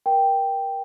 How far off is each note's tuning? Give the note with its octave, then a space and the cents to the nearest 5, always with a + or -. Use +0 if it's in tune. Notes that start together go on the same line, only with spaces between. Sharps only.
A#4 +25 G5 +0